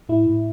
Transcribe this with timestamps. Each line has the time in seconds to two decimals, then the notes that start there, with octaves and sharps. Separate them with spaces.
0.09 A2 E4
0.26 A2